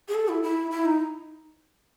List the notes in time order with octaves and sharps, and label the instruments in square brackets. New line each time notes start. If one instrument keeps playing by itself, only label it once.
[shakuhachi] G#4
A4
E4
E4
E4
D#4